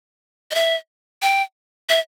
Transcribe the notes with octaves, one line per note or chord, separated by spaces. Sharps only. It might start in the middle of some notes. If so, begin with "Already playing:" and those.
D#5
E5
G5
E5